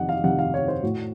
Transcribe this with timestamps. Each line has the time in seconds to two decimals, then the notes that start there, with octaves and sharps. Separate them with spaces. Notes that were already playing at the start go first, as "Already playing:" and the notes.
Already playing: F2 C3 D#3 D#5 F#5
0.09 F5
0.23 F2 C3 D#3 F#5
0.39 F5
0.54 C#5
0.68 C5
0.83 A2 F#4